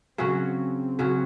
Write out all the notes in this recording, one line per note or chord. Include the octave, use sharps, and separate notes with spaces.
C#3 F#3 C4 C#4 F#4
C#3 F#3 C#4 F#4